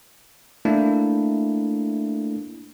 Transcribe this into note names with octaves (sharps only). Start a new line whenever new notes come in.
A3 A#3 D4 E4